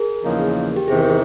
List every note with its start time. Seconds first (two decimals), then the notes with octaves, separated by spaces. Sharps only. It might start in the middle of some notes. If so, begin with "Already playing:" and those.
Already playing: G#4 A#4
0.23 E2 C#3 F3 A#3 D#4
0.76 G4
0.87 E2 C3 D#3 G#4